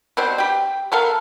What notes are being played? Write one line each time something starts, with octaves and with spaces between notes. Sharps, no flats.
B2 G3 C4 C5
G4 G5
B3 A4 A#4 F5